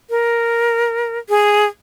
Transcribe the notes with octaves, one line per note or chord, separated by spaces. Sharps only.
A#4
G#4